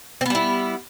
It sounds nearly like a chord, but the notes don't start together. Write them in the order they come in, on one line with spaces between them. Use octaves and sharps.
C4 B3 G3 E4